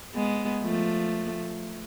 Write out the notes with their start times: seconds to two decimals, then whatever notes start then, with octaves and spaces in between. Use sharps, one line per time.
0.15 G#3 B3
0.63 F3 A3